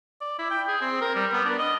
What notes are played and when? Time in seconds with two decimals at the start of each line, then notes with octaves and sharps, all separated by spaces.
0.21 D5
0.39 E4
0.50 G5
0.67 G#4
0.81 C4
1.01 A#4
1.15 G3
1.33 B3
1.45 D4
1.58 D#5